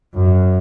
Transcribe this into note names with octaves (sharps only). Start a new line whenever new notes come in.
F#2